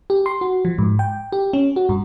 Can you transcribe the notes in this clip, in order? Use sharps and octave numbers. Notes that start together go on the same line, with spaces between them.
G4
C6
F#4
F3
G#2
G5
G4
C#4
F#4
G2